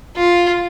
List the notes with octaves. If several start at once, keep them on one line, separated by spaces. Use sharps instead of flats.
F4